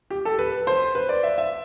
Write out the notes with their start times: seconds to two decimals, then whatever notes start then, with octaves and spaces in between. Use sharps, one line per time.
0.10 G4
0.25 A4
0.39 B4
0.67 C5
0.95 B4
1.09 D5
1.23 E5
1.38 E5